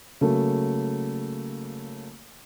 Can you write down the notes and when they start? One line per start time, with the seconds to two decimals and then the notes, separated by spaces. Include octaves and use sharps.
0.21 C#3 F#3 A3 A#3